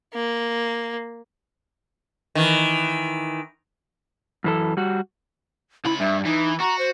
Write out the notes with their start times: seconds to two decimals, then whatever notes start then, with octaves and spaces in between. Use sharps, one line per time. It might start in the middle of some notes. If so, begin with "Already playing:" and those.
0.14 A#3
2.35 D#3 E3
4.44 F#2 E3 A4
4.77 G3 F#4
5.85 C#2 E4 B5
6.00 G2 E5
6.25 E3 D#4
6.60 F#4 A#5
6.79 C5